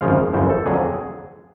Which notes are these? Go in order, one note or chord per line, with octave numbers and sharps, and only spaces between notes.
G#1 F#2 C#3 F3 G#3 F5
G1 F#2 C#3 E3 C5
A4
F2 D3 F#3 G#4